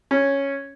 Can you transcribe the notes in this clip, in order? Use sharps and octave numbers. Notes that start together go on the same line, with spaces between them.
C#4